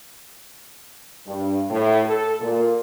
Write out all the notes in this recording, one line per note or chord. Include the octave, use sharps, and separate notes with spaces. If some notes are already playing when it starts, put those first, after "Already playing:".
G2
A2
A4
A#2